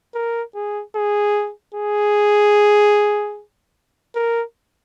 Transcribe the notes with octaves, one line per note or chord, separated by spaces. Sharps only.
A#4
G#4
G#4
G#4
A#4